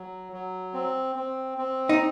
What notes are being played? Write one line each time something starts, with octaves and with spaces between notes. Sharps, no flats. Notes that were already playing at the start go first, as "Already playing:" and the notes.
Already playing: F#3
F#3
C4
C4
C4
D#4